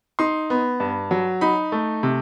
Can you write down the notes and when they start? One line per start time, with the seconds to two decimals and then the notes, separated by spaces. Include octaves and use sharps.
0.19 D#4 C6
0.50 B3
0.80 G2
1.11 F#3
1.41 D#4 B5
1.72 A3
2.03 C3